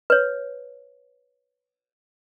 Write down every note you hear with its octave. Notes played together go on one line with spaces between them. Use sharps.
B4 C#5